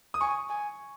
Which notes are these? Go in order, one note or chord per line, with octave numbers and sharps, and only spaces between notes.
D#6
G#5 C#6
G#5